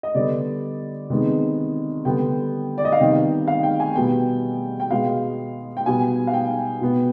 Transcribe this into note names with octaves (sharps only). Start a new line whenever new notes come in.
D#5
D3 G3 B3 D5
C3 D#3 G#3 B3
D3 G3 B3 G5
D5
D#5
F5
C3 D#3 G3 B3 G5
F5
G5
G#5
B2 G3 B3 G5
G5
B2 G#3 B3 F5
G5
B2 G3 B3 G#5
F5
G5
B2 B3